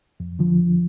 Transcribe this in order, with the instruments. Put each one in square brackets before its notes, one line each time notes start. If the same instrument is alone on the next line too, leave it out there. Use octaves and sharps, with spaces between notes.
[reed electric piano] F2
D3 F3